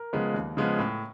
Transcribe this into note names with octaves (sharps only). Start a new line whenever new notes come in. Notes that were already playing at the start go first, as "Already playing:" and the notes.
Already playing: A#4
C#3 F3 G#3 B3
D#2
C#3 F3 G#3 B3
A2